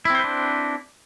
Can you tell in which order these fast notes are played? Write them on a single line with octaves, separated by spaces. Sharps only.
E4 C4 C5 B4 D4